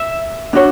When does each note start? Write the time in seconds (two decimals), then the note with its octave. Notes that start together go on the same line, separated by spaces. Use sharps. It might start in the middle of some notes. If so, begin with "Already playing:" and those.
Already playing: E5
0.53 D4 F#4 C#5